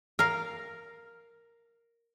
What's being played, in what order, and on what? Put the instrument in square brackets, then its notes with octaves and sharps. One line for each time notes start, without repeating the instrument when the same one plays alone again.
[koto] A#4 F5